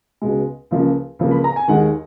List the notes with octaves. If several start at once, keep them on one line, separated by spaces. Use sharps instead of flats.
C#2 B2 G#3
C#2 C#3 F3 A#3
C#2 C#3 F3 A#3
B5
A#5
G#5
D#2 D#3 G#3 F#5